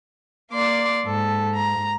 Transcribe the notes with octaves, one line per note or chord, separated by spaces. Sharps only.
A#3 D5 C6 D6
G#2 A4
A#5